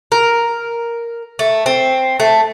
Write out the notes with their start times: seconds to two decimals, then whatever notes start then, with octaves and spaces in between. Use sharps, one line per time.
0.12 A#4
1.39 A3
1.66 C4
2.20 A3